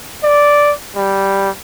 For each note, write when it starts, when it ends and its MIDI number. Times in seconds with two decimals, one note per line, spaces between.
0.23 0.73 74
0.96 1.50 55